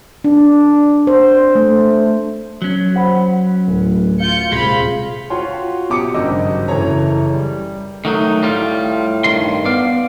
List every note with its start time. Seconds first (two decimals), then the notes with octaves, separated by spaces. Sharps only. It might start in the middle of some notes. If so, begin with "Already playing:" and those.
0.24 D4
1.07 C5
1.55 A3
2.62 F#3 C#4
2.94 C5 F#5 B5
3.67 D1
4.20 F4 F5 G6 C#7
4.52 D#1 C3 G#3 F4 G#4 F5 B5
5.30 F4 F#4 C#5 G5 C6
5.89 B2 G4 D6 D#6 C#7
6.14 G#1 G2 C#3 F#3 D#5 E6
6.68 F#1 E3 A4 C#5 A#5
7.33 G3
8.05 D#3 F#3 A3 D#4
8.43 A2 G3 F4
9.24 G2 D#3 C6
9.65 B3 D5 F5